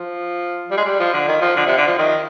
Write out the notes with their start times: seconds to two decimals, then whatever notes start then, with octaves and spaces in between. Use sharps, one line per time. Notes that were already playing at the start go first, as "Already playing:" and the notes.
Already playing: F3
0.71 G3
0.77 G#3
0.85 G3
0.99 F3
1.13 D3
1.28 D#3
1.42 F3
1.56 D3
1.66 C3
1.78 D3
1.88 F3
1.99 D#3